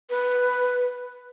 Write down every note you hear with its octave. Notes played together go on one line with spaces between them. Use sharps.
B4